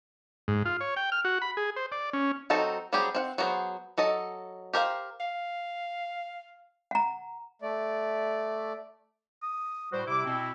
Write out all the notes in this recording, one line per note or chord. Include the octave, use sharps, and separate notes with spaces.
G#2
F4
C#5
G5
F6
F#4
B5
G#4
C5
D5
C#4
F#3 C4 D#4 F#4 A4
F#3 G3 C4 G4 G#4
C4 F5 F#5
F#3 B3 F#4 G#4 C5
F#3 A4 D#5
G4 A#4 C5 F5
F5
F#5 A#5
A3 D5
D#6
A2 G3 F#4 C5
C3 G3 E4 D6
B2 C4